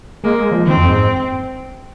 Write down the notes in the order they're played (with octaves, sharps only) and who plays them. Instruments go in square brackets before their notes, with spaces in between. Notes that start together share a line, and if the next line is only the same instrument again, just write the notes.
[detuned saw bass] G#3 [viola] A#3
[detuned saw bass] G#3
F3
[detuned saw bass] D#3 [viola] C4
[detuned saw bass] F2
G#2